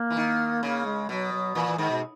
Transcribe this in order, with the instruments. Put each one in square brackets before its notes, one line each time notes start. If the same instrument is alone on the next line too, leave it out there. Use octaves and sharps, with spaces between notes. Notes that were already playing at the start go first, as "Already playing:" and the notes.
Already playing: [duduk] A#3
[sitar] E3
D#3
[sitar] C#3 [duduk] A#3
[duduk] G#3
[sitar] B2 [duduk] F#3
[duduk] F#3
[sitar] A#2 [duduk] E3
[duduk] E3
[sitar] G#2 [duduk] D#3
[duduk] B2